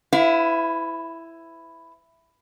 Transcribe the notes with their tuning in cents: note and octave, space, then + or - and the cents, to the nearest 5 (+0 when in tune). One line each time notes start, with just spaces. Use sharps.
E4 +5 B4 +40 F5 +35